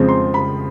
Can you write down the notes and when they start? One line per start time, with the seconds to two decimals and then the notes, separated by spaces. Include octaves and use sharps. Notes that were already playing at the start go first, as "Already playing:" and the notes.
Already playing: F2 C#3 F3 G#3 C4
0.09 C6
0.34 B5